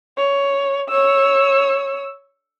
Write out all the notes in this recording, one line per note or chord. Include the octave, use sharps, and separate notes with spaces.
C#5
C#5 E6